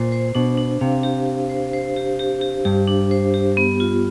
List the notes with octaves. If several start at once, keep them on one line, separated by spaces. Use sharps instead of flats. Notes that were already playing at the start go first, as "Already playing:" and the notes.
Already playing: A#2 C5
C5
B2 D4
D4
C3 F5
G4
G4
C5
C5
G4
G4
G4
G2 G4
D4
C5
G4
B3
F4